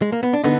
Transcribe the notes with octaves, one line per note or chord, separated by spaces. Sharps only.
G#3
A#3
B3
D4
D3 B3 D#4